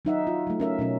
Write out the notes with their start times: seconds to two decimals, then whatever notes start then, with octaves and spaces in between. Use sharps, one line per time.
0.05 F#3 D#4 E5 F#5
0.27 F4
0.47 F#3 A3
0.60 C#4 A#4 E5
0.79 B2 F#3 C#4